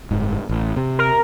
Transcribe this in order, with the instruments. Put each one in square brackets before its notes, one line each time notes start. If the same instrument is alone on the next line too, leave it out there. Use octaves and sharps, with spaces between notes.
[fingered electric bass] F#1 G#2
A1
C3
[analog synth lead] A#4